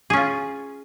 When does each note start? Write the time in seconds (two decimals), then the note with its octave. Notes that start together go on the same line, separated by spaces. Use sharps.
0.10 G#4
0.13 C#4
0.17 F4